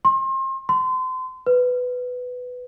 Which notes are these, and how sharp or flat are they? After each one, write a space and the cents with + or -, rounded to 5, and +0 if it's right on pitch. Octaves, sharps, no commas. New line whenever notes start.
C6 +35
C6 -30
B4 +10